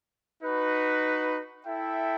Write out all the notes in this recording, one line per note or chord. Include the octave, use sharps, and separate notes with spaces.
D#4 F#4 B4
E4 A4 E5 G5